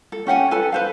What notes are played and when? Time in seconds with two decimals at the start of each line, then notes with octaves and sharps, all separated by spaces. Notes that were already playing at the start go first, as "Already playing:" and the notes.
0.12 A4
0.27 C#4 G4 F#5 G#5
0.51 A4 B4 G#5 A5
0.72 B4 C5 F5